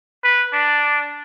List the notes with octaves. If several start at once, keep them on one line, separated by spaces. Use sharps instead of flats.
B4
D4